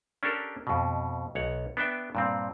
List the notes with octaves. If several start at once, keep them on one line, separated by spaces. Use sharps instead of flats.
C#4 D4 G4 A4 A#4
F2 B2
B1 C#5 F#5
B3 D4 E5 G5
G2 A#2 C4